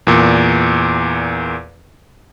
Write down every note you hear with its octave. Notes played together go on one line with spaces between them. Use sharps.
E2 A#2